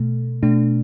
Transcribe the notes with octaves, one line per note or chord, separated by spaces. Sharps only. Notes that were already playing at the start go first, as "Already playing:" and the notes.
Already playing: B2 A3
B2 A3 D4